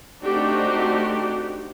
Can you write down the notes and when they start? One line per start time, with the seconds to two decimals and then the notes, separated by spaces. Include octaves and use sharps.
0.23 A3 C4 D4 D#4 F#4 G4